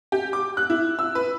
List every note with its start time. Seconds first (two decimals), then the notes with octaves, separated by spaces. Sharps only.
0.12 G4
0.33 D6
0.57 F#6
0.70 E4
0.99 E6
1.15 B4